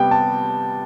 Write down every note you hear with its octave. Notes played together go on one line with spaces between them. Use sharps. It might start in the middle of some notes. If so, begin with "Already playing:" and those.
Already playing: C3 G3 B3 G5
A5